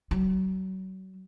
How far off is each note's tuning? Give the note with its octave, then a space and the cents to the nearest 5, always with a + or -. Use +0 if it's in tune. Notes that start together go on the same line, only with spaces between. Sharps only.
F#3 +35